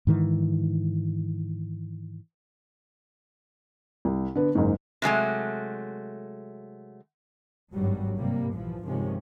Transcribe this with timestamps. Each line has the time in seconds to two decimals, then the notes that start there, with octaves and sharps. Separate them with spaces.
0.07 G#2 D#3 E3
4.05 C2
4.35 D3 B3
4.55 F#1 G#2
5.02 C3 F#3 G#3 A3
7.75 G#1 G2 F#3 G3
8.17 C3 G3 A#3
8.54 A#1 G2 E3 F3
8.84 G2 C3 D#3 F3 G#3 C#4